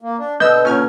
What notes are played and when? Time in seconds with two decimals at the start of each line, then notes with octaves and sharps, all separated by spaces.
0.01 A#3
0.19 D4
0.40 B2 D3 B3 D#5 E6 G6
0.65 A#2 C#4 F6 G#6